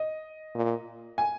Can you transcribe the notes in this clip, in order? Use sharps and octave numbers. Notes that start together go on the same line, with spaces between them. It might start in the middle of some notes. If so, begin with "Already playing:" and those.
Already playing: D#5
A#2
G#5